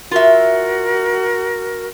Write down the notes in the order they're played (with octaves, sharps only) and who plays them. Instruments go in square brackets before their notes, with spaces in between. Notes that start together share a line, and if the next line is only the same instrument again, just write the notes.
[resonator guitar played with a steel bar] F4 E5 [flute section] F#4 A#4